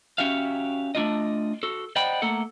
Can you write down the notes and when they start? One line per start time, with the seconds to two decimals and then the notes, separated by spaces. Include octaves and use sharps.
0.18 C#4 F#4 G4 E5 F5
0.95 A3 D4 F4 D#5
1.63 F#4 A4
1.96 C5 D5 D#5 F#5 G5 B5
2.22 A3 A#3 A4 F#5